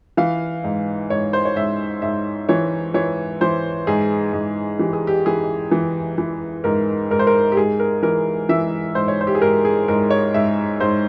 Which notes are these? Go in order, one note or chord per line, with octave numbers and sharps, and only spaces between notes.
E3 F5
G#2
G#2 C#5
C5
C#5
G#2 E5
G#2 E5
E3 C#5
E3 C#5
E3 C5
G#2 G#4
G#2
E3 G4
G#4
G4
E3 G#4
E3
E3
G#2 A#4
G#2 A#4
C5
A#4
G4
G#2 G#4
A#4
E3 A#4
E3 E5
G#2 C5
C#5
C5
G4
G#4
G#2 A#4
G#4
G#2 A#4
C#5
G#2 E5
G#2 C5